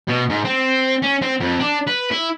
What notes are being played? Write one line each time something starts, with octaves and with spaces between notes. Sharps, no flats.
B2
G#2
C4
C#4
C4
F2
D4
B4
E4